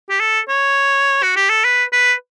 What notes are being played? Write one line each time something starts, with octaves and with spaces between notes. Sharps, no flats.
G4
A4
C#5
F#4
G4
A4
B4
B4